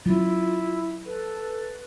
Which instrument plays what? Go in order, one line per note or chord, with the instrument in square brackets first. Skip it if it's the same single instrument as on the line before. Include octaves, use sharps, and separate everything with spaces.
[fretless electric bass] F#3 C#4 [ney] E4 [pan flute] F4
[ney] A4 [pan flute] B4